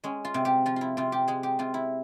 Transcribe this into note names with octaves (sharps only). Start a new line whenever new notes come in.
G#3 C#4
F4
C3
G4
F3 F4
E4 F4
C3 F4
G4
G#3 G#4
G4
C3 F4
E4